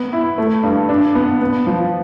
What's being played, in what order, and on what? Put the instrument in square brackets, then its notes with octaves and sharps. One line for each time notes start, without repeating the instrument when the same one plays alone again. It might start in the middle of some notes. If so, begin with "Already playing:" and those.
Already playing: [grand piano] B3
E4
A3
G2
D4
B3
B3
F3